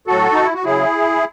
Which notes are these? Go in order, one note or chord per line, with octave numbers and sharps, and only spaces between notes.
A2 F#3 F#4 A4
D#4
E4
F#4
C#3 F#3 E4 G#4